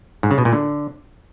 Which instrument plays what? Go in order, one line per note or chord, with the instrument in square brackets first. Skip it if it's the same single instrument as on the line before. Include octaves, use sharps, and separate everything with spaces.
[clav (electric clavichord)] G#2
C#3
B2
A#2
D3